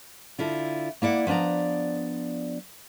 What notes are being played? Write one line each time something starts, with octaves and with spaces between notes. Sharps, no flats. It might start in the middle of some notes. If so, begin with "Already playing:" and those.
D3 E4 F4
A#3 E4 D5 F#5
F3 B3 D4 D5 A#5